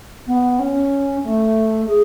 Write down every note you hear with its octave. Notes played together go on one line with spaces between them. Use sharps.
B3
C#4
A3
G#4